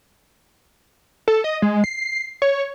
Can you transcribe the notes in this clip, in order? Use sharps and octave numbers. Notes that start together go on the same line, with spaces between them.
A4
D#5
G#3
C7
C#5